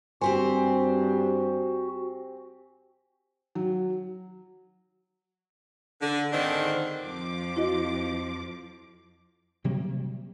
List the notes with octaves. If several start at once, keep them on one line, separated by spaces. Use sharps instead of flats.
G2 C4 F#4 G4 C5 G#5
F#3
D3
G#2 D3 D#3 C4 D4
F2 F3 D6
E4 F#4 D#5
C3 F#3 G3 A#3